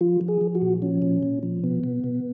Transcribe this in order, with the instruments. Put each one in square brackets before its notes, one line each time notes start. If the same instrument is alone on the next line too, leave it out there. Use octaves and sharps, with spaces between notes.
[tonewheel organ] F3 F4
F3
G#4
F3
F#4
A#2
F3 C#4
A#2
A#2
F3
B2 B3
B2
B2